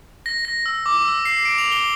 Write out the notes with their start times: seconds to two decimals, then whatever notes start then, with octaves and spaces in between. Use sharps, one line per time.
0.26 A#6
0.45 A#6
0.66 E6
0.86 D6
1.05 E6
1.25 C7
1.45 D7
1.58 F7
1.72 G7